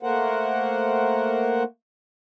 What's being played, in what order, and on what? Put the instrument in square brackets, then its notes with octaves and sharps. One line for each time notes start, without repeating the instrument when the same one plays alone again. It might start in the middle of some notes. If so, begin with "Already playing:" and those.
[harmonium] A3 A#3 A#4 C5 F#5